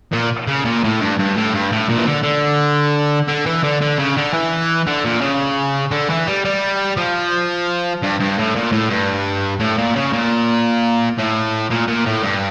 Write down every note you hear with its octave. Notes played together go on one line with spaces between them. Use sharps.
A#2
C#3
A#2
A2
G2
G2
A2
G2
A2
A#2
E3
D3
D3
D3
E3
D3
D3
C#3
D3
E3
D3
A#2
C#3
D3
E3
G3
G3
F3
G2
G2
A2
A#2
A2
G2
A2
A#2
C#3
A#2
A2
A#2
A#2
A2
G2